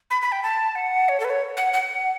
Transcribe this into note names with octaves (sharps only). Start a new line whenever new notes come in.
B5
B5
G5
A5
F#5
C#5
A4
B4
C#5
F#5
F#5